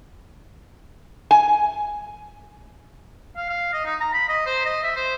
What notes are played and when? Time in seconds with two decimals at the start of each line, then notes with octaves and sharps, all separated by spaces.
1.31 G#5
3.36 F5
3.49 F5
3.73 D#5
3.85 D#4
4.00 A#5
4.13 B5
4.28 D#5
4.46 C5
4.65 D#5
4.83 E5
4.96 C5